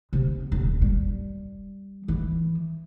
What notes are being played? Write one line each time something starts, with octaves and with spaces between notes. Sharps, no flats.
C3
D#1
G3
E3